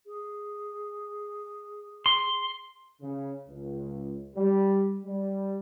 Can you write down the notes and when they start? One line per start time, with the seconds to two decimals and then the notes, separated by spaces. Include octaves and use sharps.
0.07 G#4
2.06 C6
3.02 C#3
3.49 C#2
4.37 G3
5.05 G3